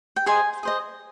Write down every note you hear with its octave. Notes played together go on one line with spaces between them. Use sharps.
G5
G#4 C5 D#5 G#5
G#4 C5 D#5